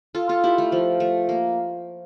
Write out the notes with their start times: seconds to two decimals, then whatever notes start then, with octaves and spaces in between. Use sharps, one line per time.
0.15 F4 A4
0.29 F4 A4
0.44 E4 G4
0.58 A3
0.72 F3
1.00 A3
1.29 A#3